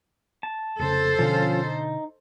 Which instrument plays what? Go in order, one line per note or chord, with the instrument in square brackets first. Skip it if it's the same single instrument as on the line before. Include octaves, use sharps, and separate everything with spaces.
[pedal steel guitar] A5
[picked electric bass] F1 C#3 [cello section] A4 C5
[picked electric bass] B2 D3 [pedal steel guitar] F3 C#4 F4
[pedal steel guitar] D#4